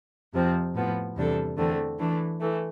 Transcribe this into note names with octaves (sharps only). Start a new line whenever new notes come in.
F2 C3 F3 C4
A2 F3 B3
E2 C3 G3 D4 A4
E2 D3 A3 C4
E3 A3 D4
E3 A3